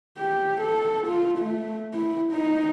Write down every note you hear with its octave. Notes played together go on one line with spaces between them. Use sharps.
G4
A4
F4
A3
E4
D#4